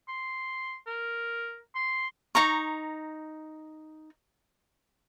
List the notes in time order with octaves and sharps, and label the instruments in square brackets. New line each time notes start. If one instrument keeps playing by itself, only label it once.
[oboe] C6
A#4
C6
[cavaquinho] D#4 A#5 C#6